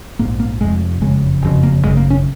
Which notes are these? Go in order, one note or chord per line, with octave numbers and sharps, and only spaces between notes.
A#1 G#2 A#3
A#3
F1 F2 C3 G#3
F#1 F2 C#3 G#3
F#1 F2 C#3
A#3
G#1 F#2 C#3 G#3
A#3
C#4